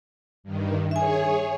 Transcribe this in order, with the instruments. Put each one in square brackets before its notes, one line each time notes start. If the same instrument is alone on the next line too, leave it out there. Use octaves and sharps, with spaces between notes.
[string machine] G2 D#3
[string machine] G#4 C#5 [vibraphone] E5 G#5